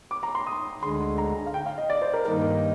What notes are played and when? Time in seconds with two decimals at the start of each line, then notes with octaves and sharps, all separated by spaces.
0.11 D6
0.23 A#5
0.35 C6
0.47 D#6
0.82 D2 D3 G#3 C6
1.18 A#5
1.46 F5
1.54 G5
1.66 F5
1.78 D#5
1.90 D5
2.02 C5
2.14 A#4
2.25 G2 D#3 A#3 D#4 A#4